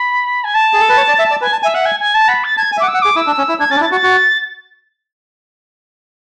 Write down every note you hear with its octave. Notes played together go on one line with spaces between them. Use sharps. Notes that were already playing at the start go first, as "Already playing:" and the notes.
Already playing: B5
G#5
A5
G#4
A4
B4
C#5
D5
E5
D5
B4 G#5
A5
E5 G#5
E5 F#5
G#5
G#5
A5
F#5 B5
A6
A5 G#6
G#5
E5 D6
F#5
E6
F#5
G#4 D6
E4 E6
D4
C#4
E4
D4 G#6
C#4 A6
D4
E4 A6
F#4 A6
F#4